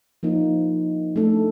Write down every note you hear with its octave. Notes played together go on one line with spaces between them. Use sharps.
F3 A#3 D#4
A3 D4 A4